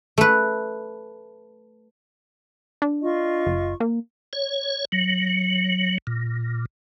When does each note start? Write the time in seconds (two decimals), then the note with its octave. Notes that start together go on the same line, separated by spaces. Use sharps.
0.18 A3 B4
2.82 D4
3.03 F4 D#5 C#6
3.46 F#1
3.80 A#3
4.33 C#5
4.92 F#3
6.07 A#2